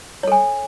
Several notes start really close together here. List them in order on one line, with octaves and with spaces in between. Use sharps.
C#5 A4 G#5